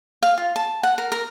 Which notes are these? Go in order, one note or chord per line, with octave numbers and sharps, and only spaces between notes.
F5
F4
A5
F#5
A#4
A#4